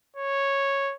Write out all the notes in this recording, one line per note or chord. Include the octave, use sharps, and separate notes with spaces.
C#5